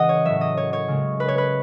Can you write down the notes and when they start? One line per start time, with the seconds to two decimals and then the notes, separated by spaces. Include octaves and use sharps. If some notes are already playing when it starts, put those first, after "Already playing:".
Already playing: C#3 E3 G#3 D#5 F#5
0.09 C#5
0.25 A2 F#3 E5
0.41 D#5
0.57 C#5
0.73 C#5
0.88 C#3 G#3
1.20 B4
1.28 C#5
1.38 B4